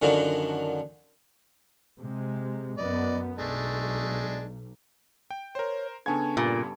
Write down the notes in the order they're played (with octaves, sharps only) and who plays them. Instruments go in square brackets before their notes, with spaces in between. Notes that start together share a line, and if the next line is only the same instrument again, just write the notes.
[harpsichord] F#2 D3 D#3 F3 F#3
[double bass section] C3 G#3
[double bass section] F#2 B3 [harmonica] D5 D#5
[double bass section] B1 [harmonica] G#3 A3 D4
[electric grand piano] G5
[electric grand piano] A#4 C5 [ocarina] C#5
[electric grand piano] C#3 B3 G#6 [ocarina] D4 [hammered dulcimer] A4 G#5 C#6
[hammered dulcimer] G2 [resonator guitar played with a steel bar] A#2